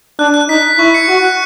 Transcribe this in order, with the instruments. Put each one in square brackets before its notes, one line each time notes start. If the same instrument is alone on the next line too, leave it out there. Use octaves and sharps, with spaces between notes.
[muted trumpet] D4 [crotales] F#6
[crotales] F#6
[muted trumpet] D#4 [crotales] B6
[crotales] B6
[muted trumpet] E4 [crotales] C#6
[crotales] C#7
[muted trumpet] F#4 [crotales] C#6
[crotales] F#6